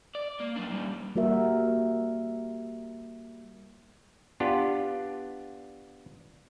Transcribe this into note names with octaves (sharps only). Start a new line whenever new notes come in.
D5
A#3
F#3 D4
A#2 G3
G3 A#3 F#4 A#4 E5
B3 D4 F4 G4